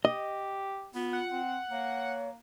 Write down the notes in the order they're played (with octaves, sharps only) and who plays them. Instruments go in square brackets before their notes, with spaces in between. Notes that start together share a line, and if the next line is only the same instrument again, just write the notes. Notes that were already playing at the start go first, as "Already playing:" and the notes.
[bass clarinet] G4 [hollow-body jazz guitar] D#5
[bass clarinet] B3 [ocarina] F4
[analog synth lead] F#5
[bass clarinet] C4
[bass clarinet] A#3 [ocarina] C#5